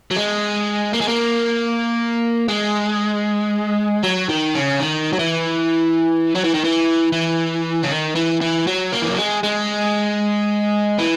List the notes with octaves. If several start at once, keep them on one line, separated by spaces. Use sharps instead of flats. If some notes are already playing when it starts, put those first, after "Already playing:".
F#3
G#3
A#3
G#3
A#3
G#3
F#3
D#3
C#3
D#3
F#3
E3
F#3
E3
D#3
E3
E3
C#3
D#3
E3
E3
F#3
A#3
E3
F#3
G#3
G#3
E3